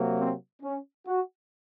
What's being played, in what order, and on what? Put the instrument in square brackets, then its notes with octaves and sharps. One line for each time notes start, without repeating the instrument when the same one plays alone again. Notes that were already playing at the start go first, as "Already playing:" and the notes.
Already playing: [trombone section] C3 F#3 A#3
C4
C#4
F#4